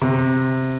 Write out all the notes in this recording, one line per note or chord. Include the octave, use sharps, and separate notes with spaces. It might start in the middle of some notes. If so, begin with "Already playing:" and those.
C3